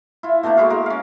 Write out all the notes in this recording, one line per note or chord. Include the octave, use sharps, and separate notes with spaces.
E4 F4
B2 D3 A3 A#3
G#3 E4 F#4 F5
G#3 A#4
C#4 F5